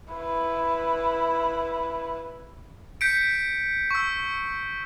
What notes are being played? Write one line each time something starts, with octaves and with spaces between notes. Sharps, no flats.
E4 B4
G6 B6 C#7 D7
C#6 E6